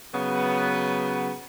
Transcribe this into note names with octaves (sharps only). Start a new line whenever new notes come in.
C#3 F#3 B3